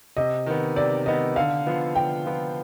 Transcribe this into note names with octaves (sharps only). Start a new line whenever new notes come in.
C3 D#5
D#3 B3
C3 D5
D#3 B3 D#5
D3 F5
F3 B3 F4
D3 G5
F3 B3 F4